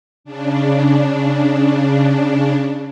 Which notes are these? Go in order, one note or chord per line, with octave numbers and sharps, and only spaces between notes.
C#3 D4